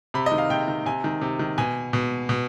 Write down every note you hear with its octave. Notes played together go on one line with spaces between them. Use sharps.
C3 B5
D#5
D#3
F5
C3 G5
D#3
C3 G#5
D#3
C3
D#3
B2 G#5
B2
B2